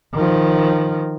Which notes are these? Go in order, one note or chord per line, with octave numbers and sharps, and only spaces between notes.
D#3 F3